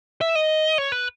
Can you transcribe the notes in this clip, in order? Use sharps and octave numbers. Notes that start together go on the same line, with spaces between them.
E5
D#5
C#5
B4